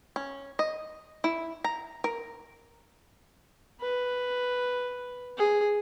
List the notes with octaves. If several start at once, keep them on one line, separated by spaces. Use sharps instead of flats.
C#4
D#5
E4
A#5
A#4
B4
G#4